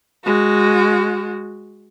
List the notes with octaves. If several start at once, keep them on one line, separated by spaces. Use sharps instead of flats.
G#3 F#4